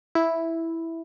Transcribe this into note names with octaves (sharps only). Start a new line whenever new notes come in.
E4